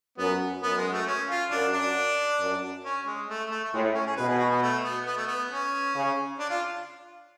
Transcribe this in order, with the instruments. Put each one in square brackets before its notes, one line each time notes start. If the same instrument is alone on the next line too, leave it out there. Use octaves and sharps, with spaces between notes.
[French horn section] F#2 [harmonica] B3
[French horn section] F#2 [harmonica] B3
[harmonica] G#3
A3
C#4
F4
[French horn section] F#2 [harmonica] D4
[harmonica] D4
[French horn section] F#2
[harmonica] C#4
G#3
A3
A3
A3
[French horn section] A2 [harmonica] G#3
[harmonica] C#4
G#4
[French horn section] B2 [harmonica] B4
[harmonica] G#4
F#4
B3
A3
B3
B3
A3
B3
C#4
[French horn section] C#3
[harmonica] D4
F4